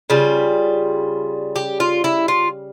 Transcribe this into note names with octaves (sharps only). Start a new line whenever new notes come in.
C#3 G3 F4
G4
F4
E4
F4